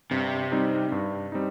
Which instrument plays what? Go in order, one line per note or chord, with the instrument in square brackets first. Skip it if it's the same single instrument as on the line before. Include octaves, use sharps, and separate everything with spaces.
[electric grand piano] G2 [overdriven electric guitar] C3
[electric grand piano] G3 C4 D#4
G2
G3 C4 D#4